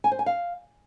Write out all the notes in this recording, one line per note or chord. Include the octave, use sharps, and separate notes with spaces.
G#5
C5
G#5
F5